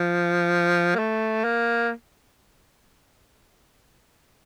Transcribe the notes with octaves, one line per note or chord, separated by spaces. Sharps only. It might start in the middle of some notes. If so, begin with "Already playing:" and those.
Already playing: F3
A#3
A3
A#3